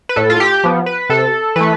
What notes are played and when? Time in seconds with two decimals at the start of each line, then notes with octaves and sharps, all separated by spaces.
0.09 B4
0.16 A2 A4
0.30 F4
0.40 G4
0.64 F3 B3
0.86 B4
1.10 C3 A4
1.56 E3 A3 B4